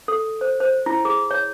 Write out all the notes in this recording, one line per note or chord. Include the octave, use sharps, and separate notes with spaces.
A4
C5
C5
E4
G#4
C#5